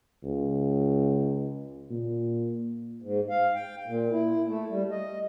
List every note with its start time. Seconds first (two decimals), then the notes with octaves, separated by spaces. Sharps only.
0.24 C#2
1.91 A#2
3.02 G#2
3.30 F5
3.55 G5
3.86 A#2
4.11 E4
4.47 A3
4.70 G3
4.91 D#5